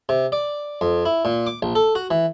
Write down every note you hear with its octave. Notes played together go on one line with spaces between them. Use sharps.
C3
D5
F2
E4
A#2
D6
A#1
A4
F#4
E3